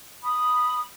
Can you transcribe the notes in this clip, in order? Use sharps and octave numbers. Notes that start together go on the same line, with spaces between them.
B5 D#6